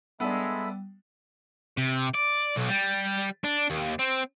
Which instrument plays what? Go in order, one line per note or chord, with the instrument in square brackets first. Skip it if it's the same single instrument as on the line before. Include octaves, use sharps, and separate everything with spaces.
[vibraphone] G3 [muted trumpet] G#3 [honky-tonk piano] B3 D4 [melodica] A4 E5 B5
[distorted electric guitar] C3
D5
B1
G3
D4
D#2
C4